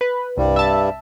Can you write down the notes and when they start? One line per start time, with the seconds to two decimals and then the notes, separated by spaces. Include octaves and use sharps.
0.01 B4
0.38 C2 G2 G3
0.56 E5 A5